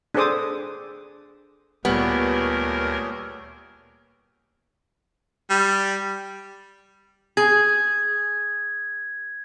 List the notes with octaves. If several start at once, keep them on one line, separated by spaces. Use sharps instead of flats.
D4 G#4 A4 C5 D6 D#6
D2 A#2 G3 B3 G4 G#4 A#4 C#5
G3
G#4 G#6